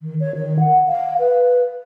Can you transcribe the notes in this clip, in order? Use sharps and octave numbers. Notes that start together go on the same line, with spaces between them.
D#3
C#5
D#3
F#5
F5
B4